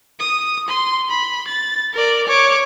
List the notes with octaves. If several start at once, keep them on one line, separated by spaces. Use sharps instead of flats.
D#6
C6
B5
A6
A#4 D5
C#5 D6